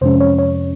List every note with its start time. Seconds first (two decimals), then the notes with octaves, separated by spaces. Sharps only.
0.01 F2 C3 F3 G#3 C#4 C5
0.21 C#5
0.38 C#5